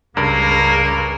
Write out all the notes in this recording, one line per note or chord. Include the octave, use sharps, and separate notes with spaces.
C#2 G2 C#3 A#3 A#4